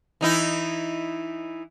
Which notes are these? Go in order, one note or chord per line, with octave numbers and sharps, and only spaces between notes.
E3 D#4 E4